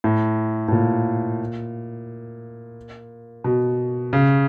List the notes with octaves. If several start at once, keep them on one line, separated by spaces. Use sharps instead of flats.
A2
A2
A#2
B2
C#3